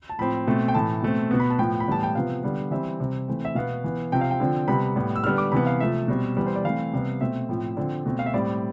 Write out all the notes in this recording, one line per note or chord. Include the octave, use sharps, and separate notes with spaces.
A5
A2 F3 C4 B5
B2 A3 C4
G5
A2 E3 A3 A5
B2 A3 C4
B2 B3
B5
A5
A2 F3 B3 G5
B5
A2 E3 G3 B3 A5
G5
C3 F3 B3 F5
D3 G3 B3
E3 G3 C4 E5
C3 G3 C4
E3 A3 C4
E5
B2 B3 F5
E3 B3
C3 F3 C4 G5
F5
G5
D3 F3 C4
C3 G3 B3 B5
A2 G3 B3
E6
D3 G3 B3 F6
D6
C3 E3 B3 B5
F5
C3 F3 A3 E5
B2 G3 C4
E3 G3 B3 D5
C5
D5
E3 A3 C4 F5
C3 G3 B3
B2 A3 C4 E5
A2 F3 C4
D3 F3 C4 D5
B2 A3 C4
F5
E5
A2 G3 C4 D5